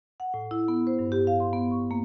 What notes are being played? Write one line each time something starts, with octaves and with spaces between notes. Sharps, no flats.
F#5
A2
E4
B3
C5
G2
G4
F5
C6
B3
C#6
A#3